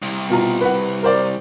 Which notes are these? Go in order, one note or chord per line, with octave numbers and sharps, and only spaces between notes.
C2
B2 F4 A#5
B4 F#5
A#4 C5 D5